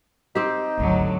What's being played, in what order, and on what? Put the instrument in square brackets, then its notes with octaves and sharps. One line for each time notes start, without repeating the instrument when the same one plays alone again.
[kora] C4 G4 [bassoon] D#4
[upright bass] G#1 D2 [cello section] D3 F#3